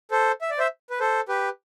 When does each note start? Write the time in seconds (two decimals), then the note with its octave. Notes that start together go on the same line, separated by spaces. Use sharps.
0.11 A4 C5
0.41 E5
0.50 D5
0.58 C5 E5
0.90 B4
1.00 A4 C5
1.29 G4 B4